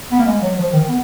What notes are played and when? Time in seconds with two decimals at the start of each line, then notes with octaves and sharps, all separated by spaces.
0.12 B3
0.19 A#3
0.26 G#3
0.42 F#3
0.58 F3
0.73 D#3
0.89 B3